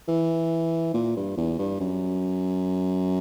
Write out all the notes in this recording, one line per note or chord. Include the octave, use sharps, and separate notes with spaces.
E3
A#2
G2
E2
G2
F#2